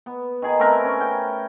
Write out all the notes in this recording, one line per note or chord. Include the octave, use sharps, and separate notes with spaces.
B3
D#3 G#4
A3 C4 A#4 B4
C#4
G5